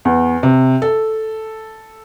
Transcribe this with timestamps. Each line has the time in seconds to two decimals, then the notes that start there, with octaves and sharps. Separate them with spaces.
0.05 E2
0.43 C3
0.82 A4